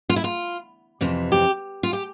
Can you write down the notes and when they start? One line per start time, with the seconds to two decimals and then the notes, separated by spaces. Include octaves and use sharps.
0.09 F4
0.16 E4
0.24 F4
1.01 F2 C3 E3
1.32 G4
1.83 F4
1.93 G4